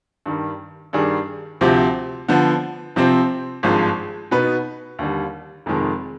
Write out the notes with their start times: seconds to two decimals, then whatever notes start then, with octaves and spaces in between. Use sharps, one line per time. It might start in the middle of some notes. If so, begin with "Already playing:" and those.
0.26 G2 D#3 G3
0.93 G2 D#3 G3 D4 G#4
1.61 D2 C3 F3 C4 G4
2.28 D3 F3 B3
2.96 C3 F3 C4
3.63 G#1 G2 F3 G#3
4.31 B2 B3 D#4 B4
4.99 D#2 D3 G3
5.66 F1 F2 D#3 G#3